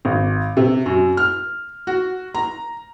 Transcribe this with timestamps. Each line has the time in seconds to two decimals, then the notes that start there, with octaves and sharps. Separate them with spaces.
0.05 G#1
0.57 C3
0.86 F#2
1.17 F6
1.87 F#4
2.34 A#5